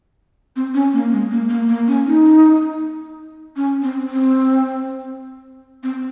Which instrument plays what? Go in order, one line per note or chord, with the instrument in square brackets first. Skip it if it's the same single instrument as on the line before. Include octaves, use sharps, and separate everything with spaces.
[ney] C4
C#4
A#3
G#3
A#3
A#3
A#3
C#4
D#4
C#4
C4
C4
C4